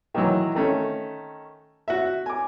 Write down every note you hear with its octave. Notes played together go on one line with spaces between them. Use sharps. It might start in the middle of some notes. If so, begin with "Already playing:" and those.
D#3 E3 F#3
D#3 A3 C#4
F#4 E5
G#5 D6